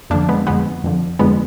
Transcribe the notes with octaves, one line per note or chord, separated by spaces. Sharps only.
F2 D3 F3 A#3 D4
G#3 B3
F2 D3 F3 G#3 B3
F2 D3 F3
F2 D3 F3 G#3 B3